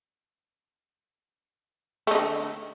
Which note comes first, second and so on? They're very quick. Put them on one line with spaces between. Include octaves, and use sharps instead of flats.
A3 D#4 D3